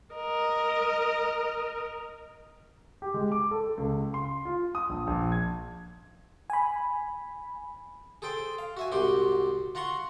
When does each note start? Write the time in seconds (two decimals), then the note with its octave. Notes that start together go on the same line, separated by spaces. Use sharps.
0.16 A#4 D#5
3.02 G4
3.14 G#3
3.32 D6
3.51 A4
3.78 C#2
4.14 C6
4.45 F4
4.75 D#6
4.89 A#1
5.07 A#1
5.32 G#6
6.50 G#5 B5
8.22 G#4 A4 C5 G5
8.58 F5
8.77 F#4 E5 G#5
8.92 C2 G#2 F#4 G4 C6
9.75 F4 F#5 A#5 C6 C#6